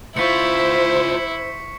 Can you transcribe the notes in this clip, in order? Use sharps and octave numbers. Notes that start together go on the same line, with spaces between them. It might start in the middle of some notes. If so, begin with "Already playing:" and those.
C#2 E4 F4 C5 C#6 B6 C#7